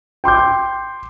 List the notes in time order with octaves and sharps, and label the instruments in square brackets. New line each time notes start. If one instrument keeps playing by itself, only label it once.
[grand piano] G5 C6 D6 G6